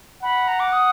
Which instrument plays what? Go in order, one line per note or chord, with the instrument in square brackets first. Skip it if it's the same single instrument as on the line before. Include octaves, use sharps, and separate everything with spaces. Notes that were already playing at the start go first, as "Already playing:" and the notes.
[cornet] F#5 [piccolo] B5
[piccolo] A#5
D6
D#6